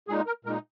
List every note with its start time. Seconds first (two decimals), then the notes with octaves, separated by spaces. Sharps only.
0.08 A#2 G#3 D#4 G#4
0.27 A#4
0.45 A#2 G#3 D#4 A#4